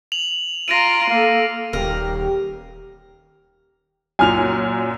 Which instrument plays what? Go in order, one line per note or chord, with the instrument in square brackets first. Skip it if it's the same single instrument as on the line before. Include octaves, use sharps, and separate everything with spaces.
[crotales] F7 F#7
[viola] F4 A#5 [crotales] A#6 D7 D#7
[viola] A#3 A4 [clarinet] F5
[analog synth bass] D#1 [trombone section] G4 [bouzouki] A#4
[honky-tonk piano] F#2 A#2 [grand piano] G#5 F6 F7